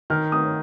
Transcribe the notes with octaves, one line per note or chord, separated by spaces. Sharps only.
D#3 F6
D#6